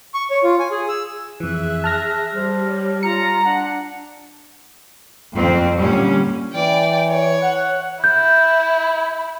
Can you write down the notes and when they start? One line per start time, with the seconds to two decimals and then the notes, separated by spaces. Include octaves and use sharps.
0.14 C#6
0.31 C#5
0.44 F4
0.59 G#5
0.71 G#4
0.89 E6
1.40 F2 E3 G#4 E5 F#6
1.84 A5 F6 A#6
2.35 G3 C5
2.69 C#5
3.03 F4 A#5 C#7
3.45 D4 F#5
5.36 F2 C4
5.79 A#2 D3 G3 C#4
6.52 E3 D5 G5
7.08 C#5
7.42 F#5
8.04 E4 G6